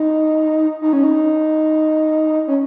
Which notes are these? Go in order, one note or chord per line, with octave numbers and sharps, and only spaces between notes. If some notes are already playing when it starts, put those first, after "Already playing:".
Already playing: D#4
D#4
C#4
D#4
C#4